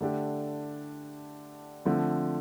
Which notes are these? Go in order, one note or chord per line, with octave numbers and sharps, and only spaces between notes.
D3 A3 D4 G4
D3 F3 A3 C4